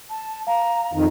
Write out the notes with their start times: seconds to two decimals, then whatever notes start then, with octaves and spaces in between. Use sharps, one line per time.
0.10 A5
0.47 F5 A#5
0.93 F2 D#3